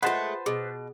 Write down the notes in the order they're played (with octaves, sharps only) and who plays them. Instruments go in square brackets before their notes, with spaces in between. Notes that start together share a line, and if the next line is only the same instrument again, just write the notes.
[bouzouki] G#3 A3 [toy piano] F4 F#5 [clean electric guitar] B4 C5 A5
[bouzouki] B2 [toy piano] G#4